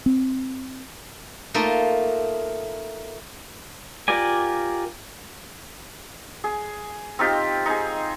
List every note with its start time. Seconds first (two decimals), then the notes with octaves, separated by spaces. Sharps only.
0.06 C4
1.54 A3 A#3 D#4 F4
4.08 F4 G4 A#4 D5 G#5
6.44 G#4
7.19 C4 D#4 F4 G4
7.66 D#4 G#4